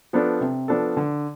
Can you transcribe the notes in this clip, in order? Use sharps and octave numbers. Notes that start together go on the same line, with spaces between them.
F3 B3 D4 A4
C3
F3 B3 D4 A4
D3